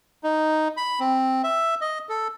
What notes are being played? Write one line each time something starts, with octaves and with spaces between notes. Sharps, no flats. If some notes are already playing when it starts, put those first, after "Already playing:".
D#4
B5
C4
E5
D#5
A4